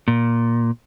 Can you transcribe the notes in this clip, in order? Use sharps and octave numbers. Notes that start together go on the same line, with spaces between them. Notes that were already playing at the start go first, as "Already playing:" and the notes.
A#2